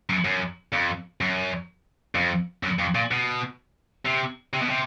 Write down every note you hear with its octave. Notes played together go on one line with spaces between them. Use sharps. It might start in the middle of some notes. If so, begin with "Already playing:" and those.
F#2
F#2
F2
F#2
F2
F#2
F2
A#2
B2
C3
C3
B2
C3